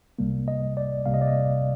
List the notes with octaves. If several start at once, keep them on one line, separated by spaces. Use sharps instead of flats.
C2 C3 G3 A#3
D#5
D5
C2 C3 G3 A#3 F5
D#5
D5
D#5